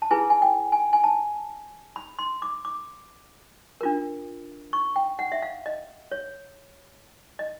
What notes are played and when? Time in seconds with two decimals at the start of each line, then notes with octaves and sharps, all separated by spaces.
0.02 A5
0.11 E4 G#4 B4 G#5
0.30 G#5
0.42 G5
0.72 G#5
0.93 G#5
1.04 A5
1.96 B5
2.19 C6
2.42 D6
2.65 D6
3.81 D4 F4 A#4
4.73 C#6
4.96 G5
5.19 F#5
5.32 E5
5.42 F5
5.66 D#5
6.11 C#5
7.39 D#5